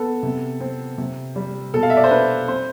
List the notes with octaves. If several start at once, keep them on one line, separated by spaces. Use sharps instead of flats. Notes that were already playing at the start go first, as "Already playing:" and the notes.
Already playing: B3 A4
C3
C4
C3
G3
B2 A4
F5
E5
D5
C5
D4 B4
C4 C5